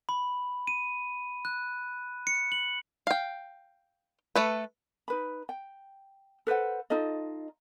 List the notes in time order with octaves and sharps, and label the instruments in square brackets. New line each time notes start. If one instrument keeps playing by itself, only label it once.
[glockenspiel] B5
D#7
F#6
C#7
F#7
[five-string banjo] F5 G5
A3 A4 B4
[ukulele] D#4 B4 B5
G5
A4 B4 C5 F#5
D#4 F4 A4 D#5